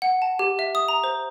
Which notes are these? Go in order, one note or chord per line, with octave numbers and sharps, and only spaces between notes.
F#5
A5
G4
E5
D#6
A#5
C5